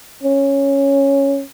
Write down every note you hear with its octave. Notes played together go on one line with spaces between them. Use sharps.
C#4